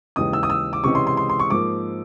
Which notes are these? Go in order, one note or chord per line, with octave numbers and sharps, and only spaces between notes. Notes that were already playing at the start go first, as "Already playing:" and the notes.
D#2 C#3 E3 G#3 D#6
E6
D#6
E6
D6
C#2 C3 E3 G#3 C#4 C#6
C6
C6
C6
C6
C#6
G#2 F3 A#3 D6